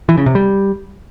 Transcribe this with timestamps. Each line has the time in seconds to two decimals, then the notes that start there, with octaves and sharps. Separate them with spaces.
0.09 E3
0.17 C#3
0.26 C3
0.35 G3